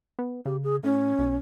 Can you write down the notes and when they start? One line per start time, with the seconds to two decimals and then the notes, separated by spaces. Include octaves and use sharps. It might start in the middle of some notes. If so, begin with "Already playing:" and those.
0.19 B3
0.46 C#3 G4
0.63 G#4
0.83 A2 C#4
1.19 B1